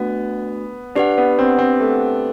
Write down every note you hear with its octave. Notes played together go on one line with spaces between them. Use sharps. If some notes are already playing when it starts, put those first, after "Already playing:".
Already playing: A3 B3 D4 F#4
D4 G4 B4 F#5
B3
C4
C4
A3